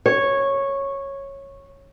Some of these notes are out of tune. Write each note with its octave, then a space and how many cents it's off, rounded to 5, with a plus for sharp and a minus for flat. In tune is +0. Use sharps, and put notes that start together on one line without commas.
C#5 -10